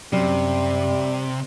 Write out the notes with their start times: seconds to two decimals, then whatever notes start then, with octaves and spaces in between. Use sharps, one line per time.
0.13 F#2 C3 G3